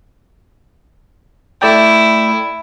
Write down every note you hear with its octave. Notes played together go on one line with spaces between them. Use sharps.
A3 E4 D5 G5